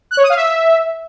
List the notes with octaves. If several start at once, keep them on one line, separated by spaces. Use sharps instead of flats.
F#6
C#5
D#6
F5
E5